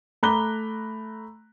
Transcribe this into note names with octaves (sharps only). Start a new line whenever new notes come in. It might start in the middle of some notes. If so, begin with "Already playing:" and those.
A3 A#5 B5 D6 F#6 G7